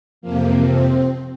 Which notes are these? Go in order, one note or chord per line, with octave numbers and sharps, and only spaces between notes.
F2 C3 F3 A#3
C4